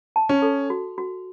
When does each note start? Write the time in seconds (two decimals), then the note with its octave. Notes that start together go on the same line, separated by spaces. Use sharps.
0.16 A5
0.29 C#4
0.42 A4
0.70 F#4
0.98 F#4